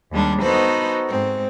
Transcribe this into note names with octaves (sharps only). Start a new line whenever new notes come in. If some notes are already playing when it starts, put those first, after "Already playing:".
D#2 G3 G#3 D4
B3 D#4 F#4 A4 B4 C5
G#2 C4